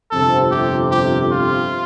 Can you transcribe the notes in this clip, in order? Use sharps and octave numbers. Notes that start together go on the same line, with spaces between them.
G1 F2 C3 A4
G4
G4
F4